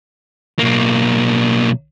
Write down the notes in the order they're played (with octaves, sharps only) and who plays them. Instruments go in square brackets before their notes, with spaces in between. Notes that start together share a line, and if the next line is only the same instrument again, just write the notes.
[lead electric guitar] B1 A#3